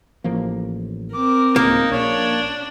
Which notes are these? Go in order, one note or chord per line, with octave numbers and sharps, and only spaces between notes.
A1 F3 A#3
C4 A#4 D6
D1 C#2 A#3 D#4
A#1 D4 C#5